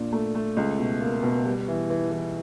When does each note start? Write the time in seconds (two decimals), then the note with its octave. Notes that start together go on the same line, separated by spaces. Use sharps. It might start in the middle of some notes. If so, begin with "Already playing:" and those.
Already playing: A#2 D4
0.13 A3
0.35 A3
0.57 C#2
0.79 B2
1.01 A#3
1.23 B2
1.45 G3
1.68 E3
1.90 E3
2.12 E3